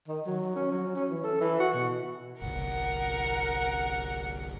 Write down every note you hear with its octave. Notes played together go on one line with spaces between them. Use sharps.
D#3
F#3
C#4
F#3
C#4
E3
A4
E3
F#4
B2
G1 C2 A#4 F#5